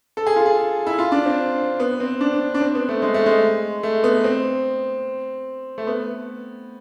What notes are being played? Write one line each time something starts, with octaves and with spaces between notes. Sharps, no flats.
A4
G#4
F4
G#4
E4
F4
D4
C4
B3
C4
D4
D4
C4
B3
A3
G#3
A3
G#3
A3
B3
C4
A3
B3